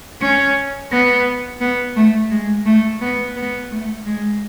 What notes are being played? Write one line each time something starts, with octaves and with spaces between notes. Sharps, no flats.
C#4
B3
B3
A3
G#3
A3
B3
B3
A3
G#3